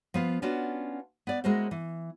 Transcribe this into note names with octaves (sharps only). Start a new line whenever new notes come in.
F3 B3 F4
B3 C#4 D4 F4 F#4
B3 D5
G#3 E4 F#4 A#4 C5
E3